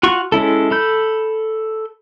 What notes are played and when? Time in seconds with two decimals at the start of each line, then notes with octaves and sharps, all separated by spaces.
0.03 F4 F#4 C#6
0.32 G#3 C#4 E4 A4
0.71 A4 B5 G6